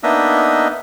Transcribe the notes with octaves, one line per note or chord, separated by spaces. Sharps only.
A#3 B3 D4 D#4 D#5 E5